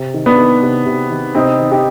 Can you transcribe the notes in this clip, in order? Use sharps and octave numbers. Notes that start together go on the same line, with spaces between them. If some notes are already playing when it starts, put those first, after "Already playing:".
Already playing: C3
D#3
B3 D4
D#3
C3
C3
D#3
C3 C4 D#4
D#3
D#4 G4